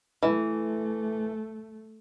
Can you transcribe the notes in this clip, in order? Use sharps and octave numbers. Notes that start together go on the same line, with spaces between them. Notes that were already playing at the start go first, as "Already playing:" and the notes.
E3 A3